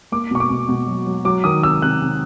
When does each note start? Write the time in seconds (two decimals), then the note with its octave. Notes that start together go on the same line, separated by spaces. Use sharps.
0.12 A#3 D6
0.31 B2 C#6
0.40 D6
0.50 B2
0.69 B2
0.87 F#3
1.07 F#3
1.25 F#3 D6
1.44 D#3 D#6
1.63 C3 E6
1.82 C3 F#6
2.01 C3